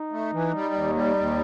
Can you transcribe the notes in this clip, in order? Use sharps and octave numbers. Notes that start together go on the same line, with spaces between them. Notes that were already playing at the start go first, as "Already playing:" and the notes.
Already playing: D#4
A3
E3
G3
D#2
G3
D#2